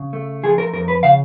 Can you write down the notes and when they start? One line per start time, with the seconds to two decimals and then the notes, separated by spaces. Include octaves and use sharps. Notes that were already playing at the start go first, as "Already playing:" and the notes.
Already playing: C#3
0.13 A3
0.43 F3 G#4
0.58 A#4
0.73 F2 A#4
0.88 B4
1.03 C#3 F5